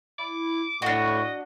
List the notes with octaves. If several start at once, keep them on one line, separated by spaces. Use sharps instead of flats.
E4 D6
A2 D4 F#4 D#5 C#6